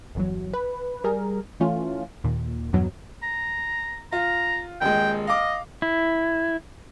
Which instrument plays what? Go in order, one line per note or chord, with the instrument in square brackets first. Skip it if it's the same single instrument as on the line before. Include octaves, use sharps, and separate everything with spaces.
[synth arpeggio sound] G1 E2 F#3
B4
G3 G#4 A#4
E3 A3 C#4 F4
D#2 A#2
E2 G2 B2 F#3
[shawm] A#5
[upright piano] F4 [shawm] A#5
[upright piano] D#1 G#3 [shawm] G5
[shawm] D#5 [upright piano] F5 D6
[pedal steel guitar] E4